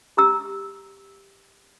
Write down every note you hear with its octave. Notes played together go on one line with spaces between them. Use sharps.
G4 A#5 E6